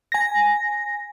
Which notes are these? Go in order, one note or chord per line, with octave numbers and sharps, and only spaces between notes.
G#5 A#6